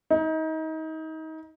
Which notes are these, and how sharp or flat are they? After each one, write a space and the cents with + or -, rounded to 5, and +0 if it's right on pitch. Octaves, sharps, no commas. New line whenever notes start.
D#4 +30